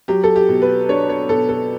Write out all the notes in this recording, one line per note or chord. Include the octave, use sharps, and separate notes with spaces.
F#3 G4
A4
G4
B2
B4
D4 C#5
C#5
B2 A4
A4